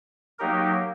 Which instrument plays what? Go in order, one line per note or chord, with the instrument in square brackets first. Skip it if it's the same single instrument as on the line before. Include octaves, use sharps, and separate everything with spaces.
[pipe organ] F#3 A#3 D#4 G4 A#4